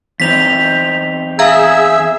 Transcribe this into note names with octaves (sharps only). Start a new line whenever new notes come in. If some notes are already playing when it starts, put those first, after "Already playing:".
E2 C4 D#4 B6 F7
G#4 E5 F5 A#5 E6 G#6